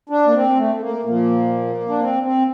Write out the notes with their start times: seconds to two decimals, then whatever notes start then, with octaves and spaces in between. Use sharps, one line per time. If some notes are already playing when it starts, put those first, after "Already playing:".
0.09 D4
0.27 A#3
0.33 C4
0.57 A3
0.75 A3
0.81 A#3
1.05 A#2 F3 A#3
1.89 D4
2.00 C4
2.23 C4